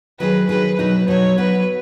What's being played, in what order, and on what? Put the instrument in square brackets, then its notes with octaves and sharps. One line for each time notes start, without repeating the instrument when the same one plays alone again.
[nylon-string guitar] D#3 F#3 D#4 G#4 [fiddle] B4
[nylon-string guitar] D#3 F#3 D#4 G#4 [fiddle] B4
[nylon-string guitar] B2 F#3 D#4 [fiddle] B4
[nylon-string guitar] B2 F#3 D#4 [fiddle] C#5
[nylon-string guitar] F#3 B3 D#4 F#4 [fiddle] B4